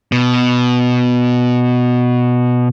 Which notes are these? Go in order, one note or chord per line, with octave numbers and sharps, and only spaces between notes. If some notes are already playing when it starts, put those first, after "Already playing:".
B2